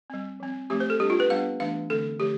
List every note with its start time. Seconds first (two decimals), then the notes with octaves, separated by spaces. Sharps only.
0.10 G3 C4
0.40 F3 C4
0.70 F3 A3 C4 G4
0.80 C5
0.90 A4
1.00 G3 D4 G4
1.10 F4
1.20 B4
1.30 G3 B3 D4 F5
1.60 E3 A3 D4 F5
1.90 D3 A3 C4 A4
2.20 D3 F3 A3 G4